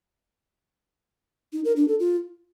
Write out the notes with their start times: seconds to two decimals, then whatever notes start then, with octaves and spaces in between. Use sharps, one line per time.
1.53 D#4
1.65 A#4
1.76 D4
1.88 A4
2.00 F4